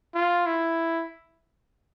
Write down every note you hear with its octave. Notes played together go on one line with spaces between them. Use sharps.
F4
E4